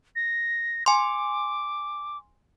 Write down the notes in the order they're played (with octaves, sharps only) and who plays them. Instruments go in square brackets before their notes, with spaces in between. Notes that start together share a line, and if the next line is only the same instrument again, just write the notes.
[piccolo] A#6
[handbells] G#5 C6 [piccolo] D6